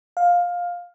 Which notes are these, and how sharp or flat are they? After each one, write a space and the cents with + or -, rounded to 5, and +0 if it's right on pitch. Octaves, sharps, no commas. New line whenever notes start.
F5 +15